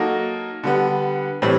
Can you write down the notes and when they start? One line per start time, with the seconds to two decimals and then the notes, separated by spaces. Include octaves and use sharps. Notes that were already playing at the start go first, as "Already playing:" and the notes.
Already playing: F#3 A#3 D#4 F#4 A4
0.64 D3 G3 B3
1.42 A2 E3 G3 C4